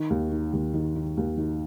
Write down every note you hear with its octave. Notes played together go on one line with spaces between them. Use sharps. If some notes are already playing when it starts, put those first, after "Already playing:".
Already playing: D#3
D#2
D#3
D#2
D#3
D#3
D#2
D#3